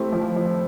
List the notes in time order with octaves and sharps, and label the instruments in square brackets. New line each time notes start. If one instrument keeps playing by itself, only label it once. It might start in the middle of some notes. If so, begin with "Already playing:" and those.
Already playing: [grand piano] A3 C4 [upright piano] E4 G4
[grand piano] F3
F3